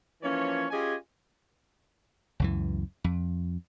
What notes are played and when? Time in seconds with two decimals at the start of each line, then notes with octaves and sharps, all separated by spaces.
0.23 E3 F3 A#3 C#4 C#5
0.71 C#4 F4 G4 G#4 D#5 G#5
2.40 C#2 F#2 E3
3.04 F2